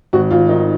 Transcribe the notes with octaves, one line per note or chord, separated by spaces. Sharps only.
G#1 F#4
G#1 F4
D#3 D#4